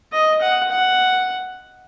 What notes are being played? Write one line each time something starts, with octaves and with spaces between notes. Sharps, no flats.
D#5
F#5
F#5